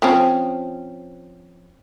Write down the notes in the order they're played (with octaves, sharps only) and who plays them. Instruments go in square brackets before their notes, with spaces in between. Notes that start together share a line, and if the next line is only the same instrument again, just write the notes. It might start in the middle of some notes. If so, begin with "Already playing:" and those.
[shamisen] F3 C4 C#4